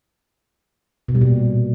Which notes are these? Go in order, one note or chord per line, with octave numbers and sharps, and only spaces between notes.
B2
G3
A#2